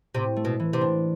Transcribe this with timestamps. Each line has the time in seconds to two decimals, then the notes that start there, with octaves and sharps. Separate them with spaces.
0.14 A2 C3
0.36 A3
0.45 B2
0.60 E3
0.73 C3
0.81 D4